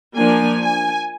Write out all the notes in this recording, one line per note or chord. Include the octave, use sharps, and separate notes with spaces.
F3 A#3 D4 G#5
G#5